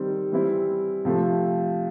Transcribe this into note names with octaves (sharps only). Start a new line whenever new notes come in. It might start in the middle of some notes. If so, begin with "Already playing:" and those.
Already playing: D#3 G3 C4
E3 G3 C4 E4
C3 F3 A3